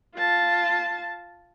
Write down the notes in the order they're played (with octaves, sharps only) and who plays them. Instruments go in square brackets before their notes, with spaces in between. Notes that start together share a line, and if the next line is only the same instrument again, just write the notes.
[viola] F4 A5